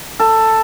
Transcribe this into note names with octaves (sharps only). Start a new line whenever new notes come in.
A4